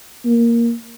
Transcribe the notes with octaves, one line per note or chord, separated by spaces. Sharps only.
A#3